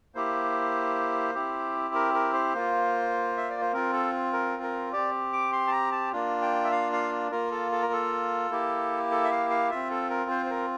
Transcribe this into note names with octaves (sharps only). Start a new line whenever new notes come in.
A#3 E4 G4 C5
C4 E4 G4
A#4
A#4
C5
A#3 F4
E5
D5
C5
C4 F4 A#4
A4
A#4
A#4
C4 G4 D5
D6
C6
A5
A#5
A5
A#3 D4 F4
G5
E5
F5
F5
A#3 F4 A#4
A4
A4
A#4
A4
A#3 E4 G4
A4
E5
F5
F5
C4 F4 E5
A4
A#4
C5
C5
A#4